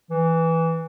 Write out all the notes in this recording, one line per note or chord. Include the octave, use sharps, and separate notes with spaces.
E3